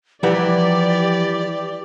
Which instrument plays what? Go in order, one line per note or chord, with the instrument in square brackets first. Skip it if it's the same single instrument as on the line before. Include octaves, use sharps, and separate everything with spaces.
[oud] E3 G3 [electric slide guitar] F3 F#5 A#5 [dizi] G4 [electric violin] D5